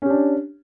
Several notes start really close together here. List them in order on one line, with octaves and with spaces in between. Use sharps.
C#4 G4 D4